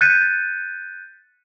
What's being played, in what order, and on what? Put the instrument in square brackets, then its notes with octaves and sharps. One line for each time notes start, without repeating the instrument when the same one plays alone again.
[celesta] F#6 G6 A6 B6 C#7 D#7